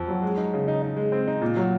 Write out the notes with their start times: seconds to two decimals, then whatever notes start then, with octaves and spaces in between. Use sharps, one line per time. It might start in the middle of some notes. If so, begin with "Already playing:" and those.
Already playing: F2
0.08 F#3
0.22 G#3
0.37 D#4
0.53 C#3
0.68 D#4
0.82 D#4
0.97 G#3
1.12 C4
1.28 D#4
1.42 A#2
1.57 F#3